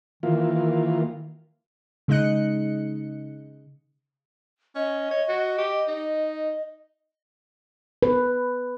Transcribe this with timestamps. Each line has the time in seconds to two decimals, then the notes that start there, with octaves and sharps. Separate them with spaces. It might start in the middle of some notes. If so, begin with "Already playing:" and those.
0.23 D#3 E3 A#3 F4
2.08 C#3 G#3 D#4 D#5 F#6 C#7
4.76 C#4 D#5
5.11 C#5
5.29 F#4
5.58 G4
5.88 D#4
8.03 B4